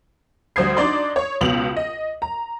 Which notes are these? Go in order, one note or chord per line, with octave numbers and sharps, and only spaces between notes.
D2 G3 C5 D#6 G#6 C7
D4 D#4 D5 C6
C#5
C#2 B2 B3 F7 F#7
D#5
A#5